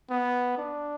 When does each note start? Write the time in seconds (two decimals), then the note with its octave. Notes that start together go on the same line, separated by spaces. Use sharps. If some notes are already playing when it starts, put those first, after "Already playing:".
0.10 B3
0.58 D4